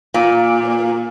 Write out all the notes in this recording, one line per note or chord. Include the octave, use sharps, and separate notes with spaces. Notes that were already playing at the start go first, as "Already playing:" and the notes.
A#2